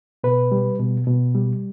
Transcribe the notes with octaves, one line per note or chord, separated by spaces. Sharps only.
B2 B4
G3
B2
B2
G3